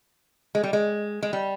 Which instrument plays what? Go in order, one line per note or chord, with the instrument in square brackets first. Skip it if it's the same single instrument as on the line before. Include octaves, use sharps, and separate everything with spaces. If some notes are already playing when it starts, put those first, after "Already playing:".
[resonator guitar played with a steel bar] G#3
G3
G#3
G#3
G3